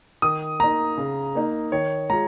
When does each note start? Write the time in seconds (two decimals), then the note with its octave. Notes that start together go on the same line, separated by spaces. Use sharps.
0.22 D#3 D#6
0.60 A#3 D#4 A#5
0.97 C#3
1.35 A#3 D#4
1.72 D#3 C#5
2.10 G#3 F4 A#5